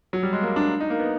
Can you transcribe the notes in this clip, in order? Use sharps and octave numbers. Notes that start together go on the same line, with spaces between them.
F#3
G3
G#3
A#3
D4
D#4
A#3
B3